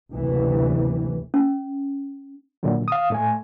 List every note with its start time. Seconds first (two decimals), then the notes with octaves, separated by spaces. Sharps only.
0.12 F#1 D2 C3 E3
1.34 C#4
2.63 A#2 D3 F#3
2.88 F5 D#6
3.10 A2 A3 G#5